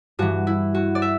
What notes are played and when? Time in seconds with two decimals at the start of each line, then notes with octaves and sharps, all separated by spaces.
0.19 G2 E3 F#4
0.47 E4
0.74 F#4
0.95 D5
1.02 E5